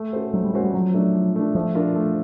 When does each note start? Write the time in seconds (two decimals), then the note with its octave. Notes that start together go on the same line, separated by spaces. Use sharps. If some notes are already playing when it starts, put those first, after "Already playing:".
Already playing: A3
0.13 C#4 F#4 A4 C5
0.33 F#3 A3
0.44 G3
0.53 G#3 C#4 F#4 A4 C5
0.64 G3
0.74 F3 F#3
0.94 A3 D4
1.14 F3
1.35 A3 D4
1.55 F3 A3
1.75 D4 F4 A#4
1.95 A3